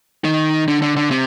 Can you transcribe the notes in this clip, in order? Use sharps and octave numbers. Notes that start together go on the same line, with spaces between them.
D#3
D3
D3
D3
C3